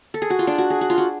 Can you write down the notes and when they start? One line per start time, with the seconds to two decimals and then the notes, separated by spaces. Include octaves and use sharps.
0.14 A4
0.22 G#4
0.30 F#4
0.39 F4
0.47 D4
0.58 F#4
0.70 G#4
0.81 F#4
0.90 F4
0.98 F#4